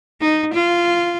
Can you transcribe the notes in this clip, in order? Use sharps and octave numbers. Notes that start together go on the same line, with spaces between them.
D#4
F4